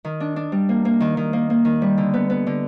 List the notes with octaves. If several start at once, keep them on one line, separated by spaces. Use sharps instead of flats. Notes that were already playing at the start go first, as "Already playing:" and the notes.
D#3
D4
D4
G3
A#3
A#3
D#3
D#3
A#3
A#3
D#3
G3
D3
B3
B3
D3